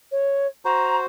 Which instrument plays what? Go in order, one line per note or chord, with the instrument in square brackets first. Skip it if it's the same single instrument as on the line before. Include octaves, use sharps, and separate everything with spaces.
[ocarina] C#5
[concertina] F#4 C5 [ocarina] A#5